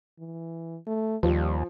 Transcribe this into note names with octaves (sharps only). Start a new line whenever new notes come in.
E3
A3
D#2 F3 G3